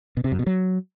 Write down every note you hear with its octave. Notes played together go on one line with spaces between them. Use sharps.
B2
C3
F#2
B2
F#3